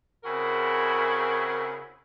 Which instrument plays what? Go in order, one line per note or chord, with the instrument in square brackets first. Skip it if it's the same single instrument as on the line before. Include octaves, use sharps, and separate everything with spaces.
[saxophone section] C#3 C4 E4 F#4 G#4 A#4